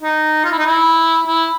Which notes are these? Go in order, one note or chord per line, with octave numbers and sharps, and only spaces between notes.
D#4
F4
E4
D#4
E4
E4